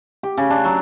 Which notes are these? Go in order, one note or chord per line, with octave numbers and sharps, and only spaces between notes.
G4
C#3
D4
F#3